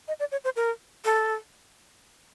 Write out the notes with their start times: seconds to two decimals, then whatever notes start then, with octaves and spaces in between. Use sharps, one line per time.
0.08 D#5
0.20 D5
0.32 C#5
0.44 C5
0.56 A#4
1.05 A4